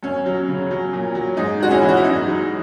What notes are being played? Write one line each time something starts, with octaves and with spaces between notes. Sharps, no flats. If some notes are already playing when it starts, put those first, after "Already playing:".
F#2 C#4
F#3
C#3
F#3
A#2
F#3
G#2 D#4
G#3 F#4
C#4 E4
E3
F#4
E4
F#2 D#4
F#3